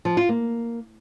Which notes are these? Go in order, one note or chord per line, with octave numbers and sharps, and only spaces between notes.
F3
F4
A#3